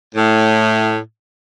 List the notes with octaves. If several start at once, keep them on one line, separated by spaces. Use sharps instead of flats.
A2